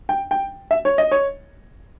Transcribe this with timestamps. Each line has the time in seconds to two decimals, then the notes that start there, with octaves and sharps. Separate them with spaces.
0.09 G5
0.31 G5
0.71 E5
0.85 C#5
0.98 D#5
1.11 C#5